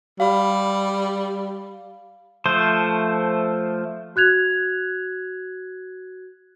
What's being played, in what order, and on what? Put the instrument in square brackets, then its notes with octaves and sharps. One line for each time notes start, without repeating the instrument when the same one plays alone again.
[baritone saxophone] G3 [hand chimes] F5 B5
[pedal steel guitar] F3 A3 C5
[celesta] F#4 F#6 G#6 F7